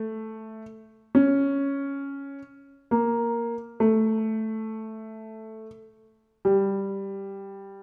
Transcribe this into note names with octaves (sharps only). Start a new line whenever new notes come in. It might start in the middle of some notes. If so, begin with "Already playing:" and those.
Already playing: A3
C#4
A#3
A3
G3